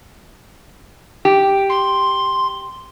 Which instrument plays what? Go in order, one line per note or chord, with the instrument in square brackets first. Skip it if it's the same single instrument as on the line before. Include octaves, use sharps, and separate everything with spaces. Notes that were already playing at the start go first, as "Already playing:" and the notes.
[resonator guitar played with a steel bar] G4
[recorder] C6